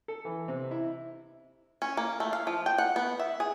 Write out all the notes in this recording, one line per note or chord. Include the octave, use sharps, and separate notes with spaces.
A4
E3
C3
E4
C#4
A#3
A3
F5
F3
G5
F#5
B3
E5
G#4